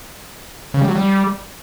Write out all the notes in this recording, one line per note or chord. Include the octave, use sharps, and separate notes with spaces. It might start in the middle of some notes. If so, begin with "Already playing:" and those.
C#3
G3
F#3
G3